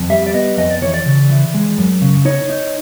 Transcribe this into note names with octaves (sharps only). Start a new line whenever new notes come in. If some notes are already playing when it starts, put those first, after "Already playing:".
Already playing: F2
G3 E5
D5
B3 D#5
F2 D#5
D5
E3 C#5
D5
C#3
E3
G#3
F#2
C#3
D#4 C#5
D#4